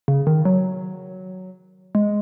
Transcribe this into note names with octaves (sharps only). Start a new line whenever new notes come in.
C#3
D#3
F#3
G#3